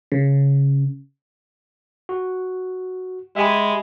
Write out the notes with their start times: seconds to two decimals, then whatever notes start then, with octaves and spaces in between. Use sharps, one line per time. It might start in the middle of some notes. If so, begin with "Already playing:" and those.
0.12 C#3
2.09 F#4
3.36 G#3 G4 E5 G#5 B5